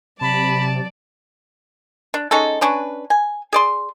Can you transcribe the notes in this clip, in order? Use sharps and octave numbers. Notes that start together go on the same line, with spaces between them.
C3 F#3 D5 A5 B5
D4
G#3 C#4 D#4 A4
C#4 D4 B4
G#5
G#4 D5 C6